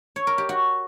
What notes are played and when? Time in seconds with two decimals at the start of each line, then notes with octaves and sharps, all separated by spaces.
0.16 C#5
0.27 A#4
0.38 G4
0.49 F#4